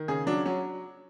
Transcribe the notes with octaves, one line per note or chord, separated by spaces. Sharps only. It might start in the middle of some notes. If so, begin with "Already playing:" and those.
Already playing: D#3
C#3 G#4
F#3 D4
F#3 C#4